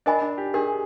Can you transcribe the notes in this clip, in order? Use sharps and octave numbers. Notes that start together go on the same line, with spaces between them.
D4 A#4 D#5 G#5 B5
D4
G4
D4 G4 G#4 A#4